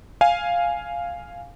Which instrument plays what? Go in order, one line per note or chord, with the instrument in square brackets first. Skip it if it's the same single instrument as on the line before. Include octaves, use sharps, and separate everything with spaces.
[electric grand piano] F5 G#5